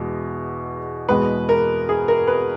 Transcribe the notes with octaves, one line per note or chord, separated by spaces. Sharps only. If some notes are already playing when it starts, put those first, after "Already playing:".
Already playing: E2 B2 G#3
E2 B2 G#3 B4
A#4
G#4
A#4
B4